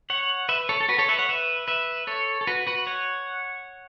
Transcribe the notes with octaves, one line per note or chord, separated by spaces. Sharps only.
C#5 F#5
B4 E5
A4 C#5
A4
F#4 B4
A4 C#5
B4 E5
C#5 F#5
B4 E5
B4 E5
A4 C#5
A4
F#4 B4
F#4 B4
C#5 F#5